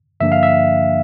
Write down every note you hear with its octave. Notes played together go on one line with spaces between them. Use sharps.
G2 D3 F3 A#3 D4 E5
F5
E5